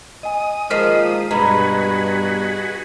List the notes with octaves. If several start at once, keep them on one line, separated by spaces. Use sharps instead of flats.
D#5 G#5 D#6
D#3 F3 G#3 A#3 F6 B6 C7
G2 B2 F#4 G#4 B4 A#5 B5